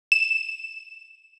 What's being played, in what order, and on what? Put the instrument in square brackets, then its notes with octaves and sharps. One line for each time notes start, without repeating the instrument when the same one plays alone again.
[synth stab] E7